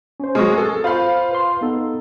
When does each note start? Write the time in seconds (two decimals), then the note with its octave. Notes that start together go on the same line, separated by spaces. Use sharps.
0.20 C#4 C5
0.35 F#3 G#3 C#6 D#6 F6
0.58 A4
0.84 F4 C5 F5 B5 G6
1.31 B4 C6
1.61 B3 D#4 A4